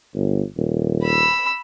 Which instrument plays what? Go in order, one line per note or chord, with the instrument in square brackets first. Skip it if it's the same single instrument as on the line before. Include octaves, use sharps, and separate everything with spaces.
[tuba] G1
D#1
[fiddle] B5 E6